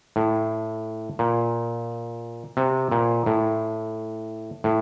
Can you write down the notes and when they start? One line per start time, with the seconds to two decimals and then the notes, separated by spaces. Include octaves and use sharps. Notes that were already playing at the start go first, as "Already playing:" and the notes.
0.16 A2
1.19 A#2
2.57 C3
2.91 A#2
3.26 A2
4.64 A2